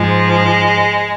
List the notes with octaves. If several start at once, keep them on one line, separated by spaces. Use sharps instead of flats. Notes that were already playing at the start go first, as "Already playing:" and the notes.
Already playing: G#2 F3 G#3